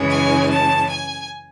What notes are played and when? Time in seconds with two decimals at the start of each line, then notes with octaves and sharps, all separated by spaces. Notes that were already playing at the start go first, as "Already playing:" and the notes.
Already playing: F#2 C#3 E3 G#3 C#4
0.10 G#5
0.50 A5
0.89 G#5